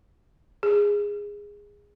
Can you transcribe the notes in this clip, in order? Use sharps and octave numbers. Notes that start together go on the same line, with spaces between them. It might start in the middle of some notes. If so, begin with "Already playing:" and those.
G#4